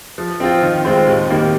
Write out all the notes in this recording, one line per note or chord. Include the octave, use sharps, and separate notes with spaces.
F3
C4 F4
D#3
G#3 C4 F4 C5
D#2
D#3 G3 A#3